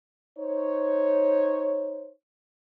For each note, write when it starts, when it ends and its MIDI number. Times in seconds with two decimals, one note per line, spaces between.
0.38 2.10 63
0.38 2.10 72
0.38 2.10 73